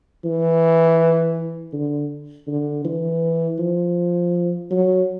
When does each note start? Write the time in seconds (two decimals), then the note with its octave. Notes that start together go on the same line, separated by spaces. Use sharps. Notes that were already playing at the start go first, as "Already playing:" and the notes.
0.24 E3
1.73 D3
2.47 D3
2.85 E3
3.59 F3
4.71 F#3